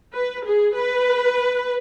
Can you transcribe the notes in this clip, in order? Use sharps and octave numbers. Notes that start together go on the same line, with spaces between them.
B4
G#4
B4